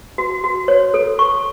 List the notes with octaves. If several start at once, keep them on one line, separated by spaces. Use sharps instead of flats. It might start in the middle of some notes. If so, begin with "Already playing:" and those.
F#4
F#4
C#5
A4
C#6